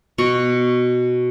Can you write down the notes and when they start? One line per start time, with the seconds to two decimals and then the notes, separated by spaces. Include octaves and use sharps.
0.18 B2 F#4 C#6